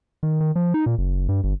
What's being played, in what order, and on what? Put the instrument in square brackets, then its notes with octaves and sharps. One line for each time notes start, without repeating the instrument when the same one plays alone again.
[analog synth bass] D#3
D#3
F3
D#4
A#2
F#1
G2
G1